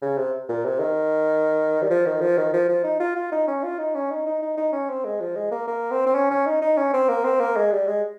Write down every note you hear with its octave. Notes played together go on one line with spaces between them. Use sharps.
C#3
C3
A#2
C3
D#3
G3
F3
D#3
F3
D#3
F3
F3
D#4
F4
F4
D#4
C#4
F4
D#4
C#4
D#4
D#4
D#4
D#4
C#4
C4
G#3
F3
G#3
A#3
A#3
C4
C4
C#4
C#4
D#4
D#4
C#4
C4
A#3
C4
A#3
G#3
G3
G#3